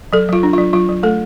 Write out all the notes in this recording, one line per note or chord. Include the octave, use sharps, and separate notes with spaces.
F#3 A4
F#3 F4
D4
F#3 F4
F#3 F4
F#3
A3 A4